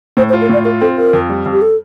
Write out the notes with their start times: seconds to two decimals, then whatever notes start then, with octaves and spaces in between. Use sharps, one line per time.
0.17 A2 C5
0.29 C5
0.33 F4
0.41 A#4
0.49 A2 D5
0.65 F4 A#4
0.81 C4 A4
0.97 F4 A#4
1.13 F2
1.29 G3
1.46 F2
1.53 G4
1.62 A4